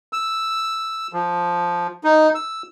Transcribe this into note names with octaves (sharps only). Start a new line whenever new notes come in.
E6
F3
D#4
E6